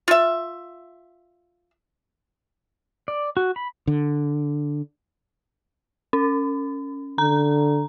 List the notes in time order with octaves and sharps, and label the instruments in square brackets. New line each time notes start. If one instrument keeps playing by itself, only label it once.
[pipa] F4 E5
[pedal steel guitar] D5
F#4
B5
[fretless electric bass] D3
[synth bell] C#4
[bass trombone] D3 [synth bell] A#5